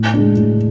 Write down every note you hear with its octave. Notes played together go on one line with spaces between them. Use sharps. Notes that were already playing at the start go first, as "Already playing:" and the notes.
Already playing: A2
G#3 D4
A2